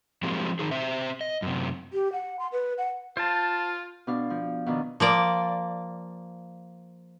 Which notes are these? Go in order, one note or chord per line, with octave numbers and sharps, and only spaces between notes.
F3 F#3 G#3 A#3 C4 G4
D#3 D#4 G#4
C4 C5 E5
D#5
F#2 C3
G4
F#5
C6
B4
F#5
F4 C5 A5
B2 D4 F5
F3
B2 D#3 D4
F3 A#3 D5